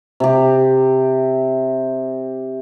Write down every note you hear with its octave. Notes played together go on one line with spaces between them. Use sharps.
C3 G4